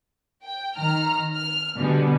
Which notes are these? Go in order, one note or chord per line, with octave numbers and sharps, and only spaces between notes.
G5
D#3 A#5 F6
F6
B2 D3 G3 G#3 B3